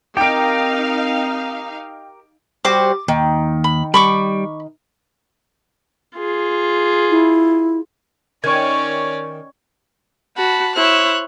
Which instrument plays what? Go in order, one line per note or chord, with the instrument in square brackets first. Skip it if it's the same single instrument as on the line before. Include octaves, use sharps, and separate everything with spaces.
[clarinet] C4 [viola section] D#4 F5 [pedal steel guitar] G4 A#4 [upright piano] G5 D7
[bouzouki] G3 F#4 C5 [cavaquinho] D6
[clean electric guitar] D#2 [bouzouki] D#3
[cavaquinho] B5
[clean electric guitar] G3 [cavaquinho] B5 C#6 D6
[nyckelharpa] F4 G#4
[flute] E4
[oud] D#3 [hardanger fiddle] C#4 D5 [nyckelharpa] C#5 [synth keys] C#6 G#6
[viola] F#4 [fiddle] A5 B5
[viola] E4 C5 [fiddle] C#5 F#6